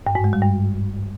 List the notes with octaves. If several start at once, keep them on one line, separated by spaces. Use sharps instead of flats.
G2
G#2
G#3
G3
G2